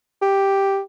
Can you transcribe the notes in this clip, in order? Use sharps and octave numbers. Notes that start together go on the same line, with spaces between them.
G4